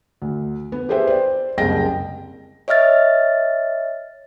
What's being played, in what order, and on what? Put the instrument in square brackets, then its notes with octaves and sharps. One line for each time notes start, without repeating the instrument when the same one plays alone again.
[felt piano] D2
B3
G4 G#4 B4 C5 E5 G5
C5 D5
F#1 C2 C#3 G#3 G5 A#6
[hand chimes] C#5 D#5 E5 F6 A6